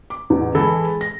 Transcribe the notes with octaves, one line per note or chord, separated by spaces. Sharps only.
D6
A1 E2
E3 G#3 E4 A4
A#6